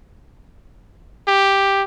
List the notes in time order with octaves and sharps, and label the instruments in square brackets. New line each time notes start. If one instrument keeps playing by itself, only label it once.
[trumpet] G4